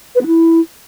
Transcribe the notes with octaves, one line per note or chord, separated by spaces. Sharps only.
B4
B3
E4